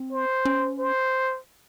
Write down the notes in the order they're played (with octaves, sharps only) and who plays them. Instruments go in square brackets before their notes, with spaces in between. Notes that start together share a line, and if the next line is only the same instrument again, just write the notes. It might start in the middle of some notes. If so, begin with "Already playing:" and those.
Already playing: [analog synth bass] C4
[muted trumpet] C5
[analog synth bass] C#4
[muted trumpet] C5